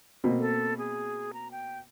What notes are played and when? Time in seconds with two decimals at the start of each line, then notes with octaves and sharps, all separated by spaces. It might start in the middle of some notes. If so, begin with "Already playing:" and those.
0.24 B2 A#3 C4
0.39 A4
0.78 G#4
1.33 A#5
1.51 G5